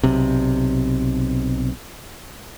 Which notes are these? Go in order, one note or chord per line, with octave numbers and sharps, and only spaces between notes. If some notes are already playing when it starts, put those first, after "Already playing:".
B1 C3